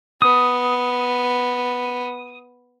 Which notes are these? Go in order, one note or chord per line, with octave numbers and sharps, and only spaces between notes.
B3 D#6